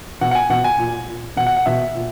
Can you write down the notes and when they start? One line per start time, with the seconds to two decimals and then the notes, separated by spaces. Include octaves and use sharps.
0.21 B2 F#5
0.31 F#5
0.35 G#5
0.50 B2 F#5
0.64 G#5
0.79 A#2
1.08 A#2
1.36 B2 F#5
1.47 F#5
1.57 F#5
1.66 B2 E5
1.95 A#2